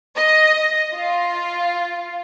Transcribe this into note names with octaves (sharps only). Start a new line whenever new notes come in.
D#5
F4